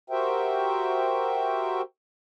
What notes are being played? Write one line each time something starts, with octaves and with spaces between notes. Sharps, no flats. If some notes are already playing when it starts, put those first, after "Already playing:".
F#4 G4 A#4 C5 E5 G5